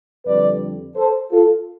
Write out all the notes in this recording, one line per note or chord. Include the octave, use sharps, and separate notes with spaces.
F2 D3 G3 B4 D5
A4 C5
F4 A4